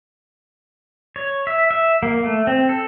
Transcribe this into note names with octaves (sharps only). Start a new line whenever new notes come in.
C#5
E5
E5
A#3
A3
C4
A4